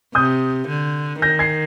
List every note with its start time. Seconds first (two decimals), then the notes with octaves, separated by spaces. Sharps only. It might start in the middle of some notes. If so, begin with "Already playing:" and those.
0.15 C3 D#6 G6
0.68 D3
1.22 D#3 G6 A#6
1.39 G#6 C7